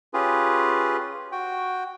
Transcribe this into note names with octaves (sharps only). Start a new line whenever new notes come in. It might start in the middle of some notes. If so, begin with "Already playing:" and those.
C#4 F4 G4 G#4 B4
F#4 G5